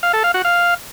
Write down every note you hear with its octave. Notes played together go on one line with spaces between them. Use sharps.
F5
A4
F5
F#4
F5